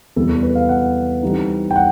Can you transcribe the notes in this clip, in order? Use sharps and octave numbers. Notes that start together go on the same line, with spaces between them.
E2 C3 E3 G3 B3 A4
A4
B4
F5
F#5
E3 G3 C4 D#4
G5
F#5